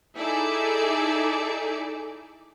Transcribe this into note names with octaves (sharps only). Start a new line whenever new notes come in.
D#4 E4 G#4 A4 D5